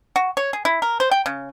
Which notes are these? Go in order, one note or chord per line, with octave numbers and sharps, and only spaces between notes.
F#4
C#5
G#4
E4
A#4
C5
G5
C#3